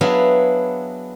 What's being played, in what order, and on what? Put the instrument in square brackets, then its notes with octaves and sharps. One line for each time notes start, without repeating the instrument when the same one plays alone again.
[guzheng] F#3 B3 D4 E4 G#4 F5